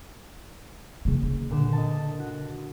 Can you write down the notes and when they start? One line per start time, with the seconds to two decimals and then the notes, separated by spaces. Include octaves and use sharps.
1.05 C#3 A#3
1.51 A#2 D3 E7
1.73 D#5 A5
2.20 F#4